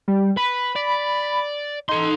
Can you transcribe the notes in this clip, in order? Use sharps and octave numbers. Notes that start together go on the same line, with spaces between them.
G3
B4 B5
D5
D#4 A4 C6